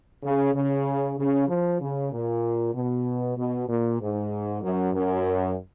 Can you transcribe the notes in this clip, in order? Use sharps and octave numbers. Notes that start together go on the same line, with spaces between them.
C#3
C#3
C#3
F3
C#3
A#2
B2
B2
A#2
G#2
F#2
F#2